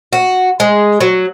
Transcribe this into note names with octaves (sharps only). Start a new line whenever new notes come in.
F#4
G#3
F#3